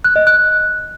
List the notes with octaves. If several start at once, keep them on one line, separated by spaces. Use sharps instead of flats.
F#6
D#5
F#6